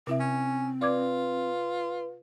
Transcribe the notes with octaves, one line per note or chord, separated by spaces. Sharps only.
C3 C4 E4 E5
C#4
F4 B4 D5 D6 G#6